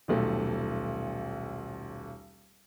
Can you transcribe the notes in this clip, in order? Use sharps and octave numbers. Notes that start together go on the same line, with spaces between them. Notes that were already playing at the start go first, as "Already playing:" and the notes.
D#1 B1 A3